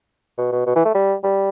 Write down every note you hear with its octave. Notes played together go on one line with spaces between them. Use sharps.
B2
B2
B2
E3
A3
G3
G3